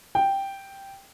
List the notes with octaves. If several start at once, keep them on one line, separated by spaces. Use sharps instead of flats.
G5